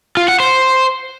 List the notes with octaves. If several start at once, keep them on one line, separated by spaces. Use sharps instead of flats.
F4
F#5
C5